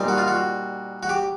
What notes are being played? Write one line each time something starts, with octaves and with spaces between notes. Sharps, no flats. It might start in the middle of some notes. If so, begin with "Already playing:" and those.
Already playing: A#2 G3 C4 D#4
F#4
F4
F#4
F#4
G4